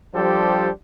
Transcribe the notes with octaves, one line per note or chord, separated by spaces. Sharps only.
F3 G3 D4 G4 A4 C5